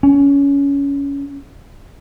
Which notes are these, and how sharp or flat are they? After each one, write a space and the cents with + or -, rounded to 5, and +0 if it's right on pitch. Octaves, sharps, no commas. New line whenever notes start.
C#4 +20